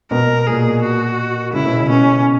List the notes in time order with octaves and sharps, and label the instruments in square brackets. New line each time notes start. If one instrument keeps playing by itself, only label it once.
[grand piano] B2 B3 [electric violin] A#4
[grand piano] A#2 A#3 [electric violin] G#4
[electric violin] F#4
[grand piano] C#3 C#4 [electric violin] E4
[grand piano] B2 B3
C#3 C#4
[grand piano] B2 B3 [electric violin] C#4